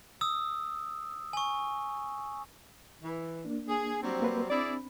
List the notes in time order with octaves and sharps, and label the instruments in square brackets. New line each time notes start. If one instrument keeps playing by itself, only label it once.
[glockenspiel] D#6 E6
G#5 C#6
[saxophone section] E3
[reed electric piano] A#3 D4
[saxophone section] G#4
F#3 G3 C4
[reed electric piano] A#3 B4 C5
[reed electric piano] C4 D4 B5 [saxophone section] E4 G#4 D5